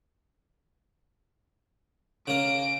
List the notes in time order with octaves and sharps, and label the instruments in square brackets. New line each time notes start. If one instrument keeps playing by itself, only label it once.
[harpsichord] C#3 A#3 [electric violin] D7